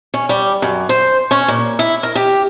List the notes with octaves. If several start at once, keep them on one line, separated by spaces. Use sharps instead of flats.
C#4
G3
F#2
C5
C#4
A#2
E4
A#4
G4